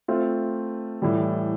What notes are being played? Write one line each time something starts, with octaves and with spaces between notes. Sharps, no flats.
A3 C4 F4
A2 E3 G3